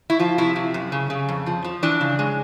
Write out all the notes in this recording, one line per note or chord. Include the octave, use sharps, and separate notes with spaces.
E4
F3 F4
C3 E4
C3
F#2
C#3
C#3
F2
F3
F3
E3 D4
C#3
G#3